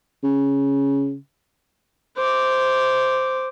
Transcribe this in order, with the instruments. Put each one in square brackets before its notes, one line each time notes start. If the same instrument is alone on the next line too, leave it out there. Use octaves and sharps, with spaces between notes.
[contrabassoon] C#3
[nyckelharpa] C5 D6